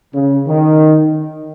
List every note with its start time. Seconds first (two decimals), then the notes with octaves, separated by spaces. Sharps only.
0.14 C#3
0.48 D#3